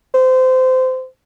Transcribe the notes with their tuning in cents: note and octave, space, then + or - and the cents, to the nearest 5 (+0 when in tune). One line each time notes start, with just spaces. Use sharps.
C5 -25